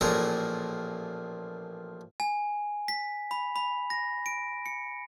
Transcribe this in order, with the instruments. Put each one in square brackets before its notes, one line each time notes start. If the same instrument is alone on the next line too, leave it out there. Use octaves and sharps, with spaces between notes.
[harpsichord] A1 A#2 F3 E4 G#4 A#5
[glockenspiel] G#5
B6
B5
B5
A#6
D7
C#7